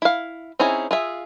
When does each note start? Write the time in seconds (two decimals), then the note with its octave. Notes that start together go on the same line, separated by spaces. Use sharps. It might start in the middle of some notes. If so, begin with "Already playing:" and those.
0.02 E4 F5
0.60 C4 C#4 D#4 E4 G#4
0.91 F4 G#4 E5